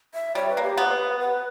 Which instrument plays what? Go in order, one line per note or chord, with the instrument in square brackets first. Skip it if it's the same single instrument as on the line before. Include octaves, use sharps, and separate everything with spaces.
[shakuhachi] E5
[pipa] G3 [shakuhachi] C#5
[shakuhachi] B4
[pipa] A#3
[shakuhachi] G4
[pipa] B3 [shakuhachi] C#5
[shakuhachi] B4
B4